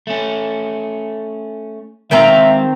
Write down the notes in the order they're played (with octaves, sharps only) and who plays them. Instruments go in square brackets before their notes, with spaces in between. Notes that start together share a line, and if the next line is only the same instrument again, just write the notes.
[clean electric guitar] A3 C#4
[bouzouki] D#3 C4 A#5 [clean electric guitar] G#3 F5 [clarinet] E5